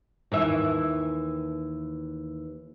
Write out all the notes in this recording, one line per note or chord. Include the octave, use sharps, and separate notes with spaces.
D#2 E3 E5